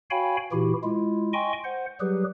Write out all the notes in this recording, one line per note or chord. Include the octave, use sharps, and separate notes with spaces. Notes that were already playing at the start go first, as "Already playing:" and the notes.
F#4 C#5 F5 G5 G#5 B5
A#2 E3 E4 F#4 G4
G#3 E4 F4
D#5 G5 G#5 C6 C#6
C5 F#5
F#3 G3 G4 G#4 B4